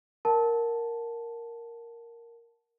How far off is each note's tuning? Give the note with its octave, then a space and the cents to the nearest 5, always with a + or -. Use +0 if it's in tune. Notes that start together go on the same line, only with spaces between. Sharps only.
A#4 +0 F#5 +0 A5 -5